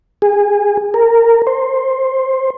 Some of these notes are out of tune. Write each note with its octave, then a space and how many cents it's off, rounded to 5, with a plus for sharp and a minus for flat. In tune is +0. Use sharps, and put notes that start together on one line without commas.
G#4 -25
A#4 -15
C5 +10